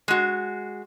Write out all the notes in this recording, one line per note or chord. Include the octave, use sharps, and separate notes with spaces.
G#3 F#4